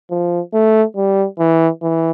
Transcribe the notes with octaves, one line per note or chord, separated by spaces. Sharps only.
F3
A3
G3
E3
E3